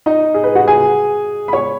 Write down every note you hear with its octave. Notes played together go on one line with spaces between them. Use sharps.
D#4 D#5
G#4
B4
F#4 F#5
G#4 G#5
B5
C#5 C#6